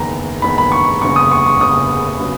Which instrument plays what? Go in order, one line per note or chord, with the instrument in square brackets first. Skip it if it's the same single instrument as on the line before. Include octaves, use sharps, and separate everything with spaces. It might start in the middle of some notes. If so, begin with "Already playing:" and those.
Already playing: [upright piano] F#1 E2 D#3 A#5
F#1 E2 D#3 B5
B5
C#6
F#1 E2 C#3 C#6
D#6
C#6
C#6
F#1 E2 C#3 D#6
C#3 F#3 B3